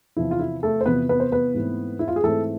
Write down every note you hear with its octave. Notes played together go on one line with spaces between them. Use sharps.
E2 C3 F3 E4
F4
E4
A3 A4
C5
E2 C3 F3 B3 B4
B3 B4
C5
B3 B4
G#2 E3 A3 C4
E4
F4
G#4
G#2 E3 A3 C4 A4